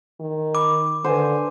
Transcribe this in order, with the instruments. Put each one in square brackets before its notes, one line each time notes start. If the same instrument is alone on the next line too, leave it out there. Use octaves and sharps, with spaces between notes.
[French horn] D#3
[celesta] B5 [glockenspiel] D6
[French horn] D3 [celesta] A4 B4 [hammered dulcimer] C5 G#5